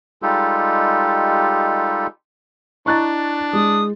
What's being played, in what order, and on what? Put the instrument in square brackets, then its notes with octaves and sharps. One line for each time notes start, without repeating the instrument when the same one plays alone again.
[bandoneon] G3 G#3 D#4 F4 G4 A4
[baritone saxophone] D4 [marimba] E4 D#5 A#5 [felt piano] C#6 F#6 A6
[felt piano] G#3 [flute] D#6